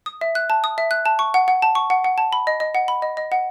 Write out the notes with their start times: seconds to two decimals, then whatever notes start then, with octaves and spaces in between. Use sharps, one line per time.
0.06 D#6
0.21 E5
0.35 F#6
0.50 A5
0.64 D#6
0.78 E5
0.91 F#6
1.06 A5
1.19 C#6
1.34 F#5
1.48 F#5
1.62 A5
1.75 C#6
1.90 F#5
2.04 F#5
2.18 A5
2.33 B5
2.47 D#5
2.60 D#5
2.75 F#5
2.88 B5
3.02 D#5
3.17 D#5
3.32 F#5